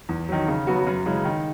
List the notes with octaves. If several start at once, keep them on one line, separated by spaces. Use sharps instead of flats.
E2
D#3 F#3
C#3
F#3 B3 F#4
F#2
C#3 E3 G#3
D#3